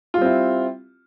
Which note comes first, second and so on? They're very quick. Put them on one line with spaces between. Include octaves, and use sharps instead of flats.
F4 G3 C4 E4